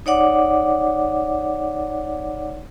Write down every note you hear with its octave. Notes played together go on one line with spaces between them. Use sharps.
D#4 C#5 D5 F#5 D6